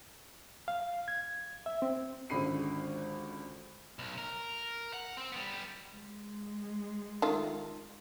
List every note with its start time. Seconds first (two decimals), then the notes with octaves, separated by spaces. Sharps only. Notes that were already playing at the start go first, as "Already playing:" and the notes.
0.68 F5
1.08 G#6
1.66 E5
1.82 C4
2.29 G#1 C#2 D3 B5 C7 D#7
3.99 B1
4.18 A#4
4.93 F#5
5.17 C4
5.32 G3 B3
5.93 G#3
7.22 D#3 A3 F4